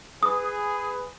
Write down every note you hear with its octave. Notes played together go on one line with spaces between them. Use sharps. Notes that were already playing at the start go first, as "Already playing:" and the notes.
G#4 B4 D#6